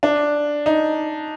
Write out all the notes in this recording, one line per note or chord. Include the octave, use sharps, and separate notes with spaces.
D4
D#4